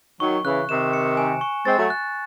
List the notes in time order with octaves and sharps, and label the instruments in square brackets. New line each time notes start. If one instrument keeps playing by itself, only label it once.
[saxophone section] D#3 F#3 [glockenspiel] C#6
[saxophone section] C#3 E3 [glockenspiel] F#6
[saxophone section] C3 D#3 [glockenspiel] E7
[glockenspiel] C#7
G#5
C#6
[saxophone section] G#3 C4 [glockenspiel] A6
[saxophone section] F#3 A3
[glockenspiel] F#6